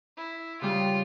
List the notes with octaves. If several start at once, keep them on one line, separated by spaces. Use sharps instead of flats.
E4
C#3 G3 F4